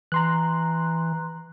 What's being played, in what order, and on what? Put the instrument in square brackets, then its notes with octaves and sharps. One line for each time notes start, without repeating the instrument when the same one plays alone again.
[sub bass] E3 [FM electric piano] A#5 C6 F#6